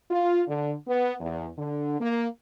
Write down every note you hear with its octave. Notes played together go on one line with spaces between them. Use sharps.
F4
D3
B3
E2
D3
A#3